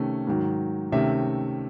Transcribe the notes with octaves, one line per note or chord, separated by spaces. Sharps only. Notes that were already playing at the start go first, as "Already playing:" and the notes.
Already playing: C3 D#3 A3 C#4
G#2 D#3 F#3
C3 D#3 A3 C#4 E5